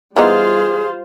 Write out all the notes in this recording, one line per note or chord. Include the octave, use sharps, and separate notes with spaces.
E3 G3 B3 D#4 F4 G#4 C5